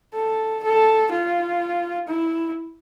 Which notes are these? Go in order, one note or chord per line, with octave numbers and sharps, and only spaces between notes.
A4
A4
F4
E4